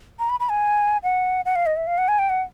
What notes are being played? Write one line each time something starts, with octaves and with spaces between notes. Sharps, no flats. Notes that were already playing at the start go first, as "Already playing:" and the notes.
A#5
B5
B5
G#5
F#5
F#5
F5
D#5
E5
F5
F#5
G#5
G5
F#5